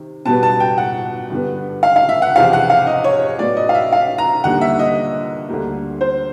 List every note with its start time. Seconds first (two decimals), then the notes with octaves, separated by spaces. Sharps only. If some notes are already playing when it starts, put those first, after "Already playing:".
Already playing: C3 D#3
0.26 B2 G3 B3 A5
0.43 A5
0.60 G5
0.78 F#5
1.30 G2 D3 G3 B3
1.83 F5
1.96 F5
2.09 E5
2.22 F#5
2.35 E2 C3 F3 F5
2.53 F#5
2.70 F5
2.87 D#5
3.04 C#5
3.39 A2 F#3 B3 D5
3.57 D#5
3.69 F5
3.75 E5
3.93 F5
4.18 A#5
4.44 D#2 D3 G3 A#3 F#5
4.61 E5
4.79 D#5
5.49 D2 D3 G3 A#3
6.01 C5